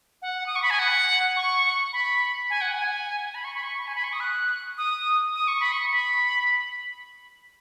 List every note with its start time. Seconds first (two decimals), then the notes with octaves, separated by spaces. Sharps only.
0.22 F#5
0.46 D#6
0.56 C#6
0.62 B5
0.70 G#5
0.79 F#5
1.36 C#6
1.93 B5
2.50 G#5
2.61 F#5
2.72 G#5
3.29 G#5
3.35 B5
3.44 C#6
3.54 B5
3.63 C#6
3.87 G#5
3.95 B5
4.04 C#6
4.13 D#6
4.20 F#6
4.78 D#6
5.35 D#6
5.48 C#6
5.60 B5
5.72 C#6
5.92 B5